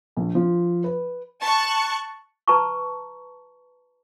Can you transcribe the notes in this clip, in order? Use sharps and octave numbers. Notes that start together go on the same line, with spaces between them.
A#1
F3
B4
A5 C#6 F#6
B4 A5 A#5 C#6